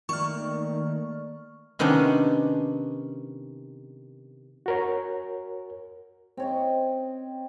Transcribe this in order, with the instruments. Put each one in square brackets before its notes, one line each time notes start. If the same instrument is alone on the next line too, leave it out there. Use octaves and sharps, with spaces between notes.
[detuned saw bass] D#3 [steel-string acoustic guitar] A3 A#3 D5 [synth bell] C#6 F6
[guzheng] C3 D#3 B3 C#4 D4
[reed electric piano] F#4 A#4 C#5
[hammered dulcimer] C4 C#5 D#5